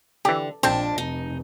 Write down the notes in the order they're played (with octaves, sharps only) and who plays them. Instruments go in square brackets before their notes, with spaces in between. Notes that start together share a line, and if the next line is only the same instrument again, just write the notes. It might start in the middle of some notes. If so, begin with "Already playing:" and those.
[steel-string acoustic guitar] D3 [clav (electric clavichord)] E3 G4
[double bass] A#1 [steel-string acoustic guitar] F2 D4 A5 [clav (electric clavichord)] C4
[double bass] F1 [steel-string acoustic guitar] D#4